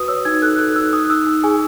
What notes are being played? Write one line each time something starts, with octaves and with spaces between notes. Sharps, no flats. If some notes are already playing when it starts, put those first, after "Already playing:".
Already playing: F#4 B4 D#6
C#5 E6
D#4 G#6
A4 F#6
A4 F#6
D#4 E6
D#4 D#6
D#4 E6
D#4
G#4 G#5